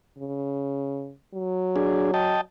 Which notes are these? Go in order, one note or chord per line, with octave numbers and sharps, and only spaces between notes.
C#3
F#3
D4 G#4
D#5 G5 A5